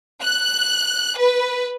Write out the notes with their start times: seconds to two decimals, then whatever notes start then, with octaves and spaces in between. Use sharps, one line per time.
0.22 F#6
1.18 B4